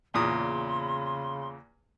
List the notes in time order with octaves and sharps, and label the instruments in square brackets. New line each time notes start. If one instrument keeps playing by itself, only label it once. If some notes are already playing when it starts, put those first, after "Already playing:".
[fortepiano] E2 A#2 D#6 [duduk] C#3 [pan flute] C6